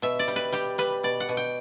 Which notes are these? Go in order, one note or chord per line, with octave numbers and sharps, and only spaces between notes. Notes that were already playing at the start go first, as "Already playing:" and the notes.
B2 E5
D5
G3
B4
G3 G4
G3 B4
B2 D5
F#5
B2
G5